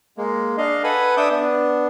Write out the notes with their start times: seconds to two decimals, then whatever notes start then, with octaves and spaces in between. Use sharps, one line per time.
0.17 G#3 A#3
0.58 D4 D#5 F5
0.84 A4 B4 F#5 G#5 B5
1.17 D4 E5 D6 D#6 G6
1.31 B3 D4